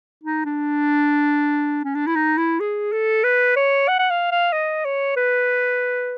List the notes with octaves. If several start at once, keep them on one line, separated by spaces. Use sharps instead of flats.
D#4
D4
C#4
D4
E4
D#4
E4
G#4
A4
B4
C#5
F#5
F#5
F5
F5
D#5
C#5
B4